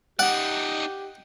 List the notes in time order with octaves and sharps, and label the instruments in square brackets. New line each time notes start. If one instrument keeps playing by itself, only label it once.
[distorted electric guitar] D#4 D5 [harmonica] G4 [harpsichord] F#5